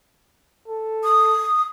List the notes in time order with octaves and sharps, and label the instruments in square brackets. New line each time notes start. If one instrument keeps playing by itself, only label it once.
[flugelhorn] A4
[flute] D#6